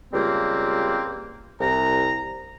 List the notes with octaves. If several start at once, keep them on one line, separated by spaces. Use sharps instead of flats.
C#2 G3 A#3 C4
C2 A#5